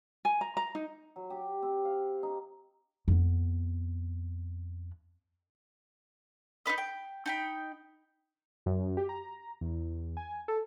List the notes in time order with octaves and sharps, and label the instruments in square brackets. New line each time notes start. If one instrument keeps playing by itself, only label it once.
[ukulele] G#5
A#5
A#5
D#4
[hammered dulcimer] F#3
G4
C4
F5
D#4
[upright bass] F2 B3
[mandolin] D#4 F4 B4 D#5
G5
D#4 G5 B5
[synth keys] F#2
G4
A#5
E2
G#5
A4